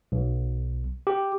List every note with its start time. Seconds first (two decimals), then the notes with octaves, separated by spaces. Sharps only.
0.12 B1
1.07 G4